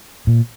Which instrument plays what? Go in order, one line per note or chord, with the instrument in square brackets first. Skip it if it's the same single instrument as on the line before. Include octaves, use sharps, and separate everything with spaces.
[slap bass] A#2